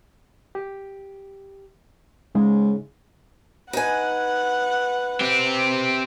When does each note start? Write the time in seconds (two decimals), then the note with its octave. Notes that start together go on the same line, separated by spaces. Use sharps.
0.55 G4
2.35 G#2 C#3 G#3
3.73 D#4 B4 F#5 G#5
5.21 C4 G4